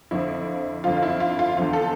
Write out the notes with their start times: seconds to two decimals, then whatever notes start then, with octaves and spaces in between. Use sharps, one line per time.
0.11 F2 D3 F3 E4
0.84 F2 D3 F3 F4
0.97 F4
1.02 E4
1.20 F4
1.39 F4
1.57 E2 D3 F3 F4
1.73 A4